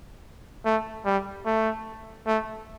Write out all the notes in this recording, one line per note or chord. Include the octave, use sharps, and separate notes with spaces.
A3
G3
A3
A3